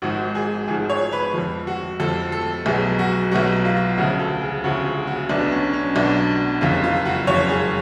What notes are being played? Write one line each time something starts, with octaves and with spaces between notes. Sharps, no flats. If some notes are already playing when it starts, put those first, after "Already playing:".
G#1 G#2 F3 F#4
G#4
G#1 G#2 F3 G#4
C#5
B4
F2 F3
F#4
F2 F3 A4
A4
B1 B2 F#3 G#4
F#4
B1 B2 F#3 F#4
F4
D2 C#3 F3 F#4
A4
G#4
D2 C#3 F3 F#4
G#4
F#4
B1 B2 F#3 D4
C#4
C#4
B1 B2 F#3 D4
F#1 F2 C#3 F4
F4
F#4
F#1 F2 C#3 C#5
G#4